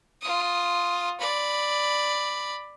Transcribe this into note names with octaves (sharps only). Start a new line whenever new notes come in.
F4 D#6
D5 B5